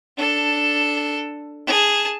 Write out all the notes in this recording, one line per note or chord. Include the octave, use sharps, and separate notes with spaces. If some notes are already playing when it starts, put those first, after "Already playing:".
D4 A4
G#4 A5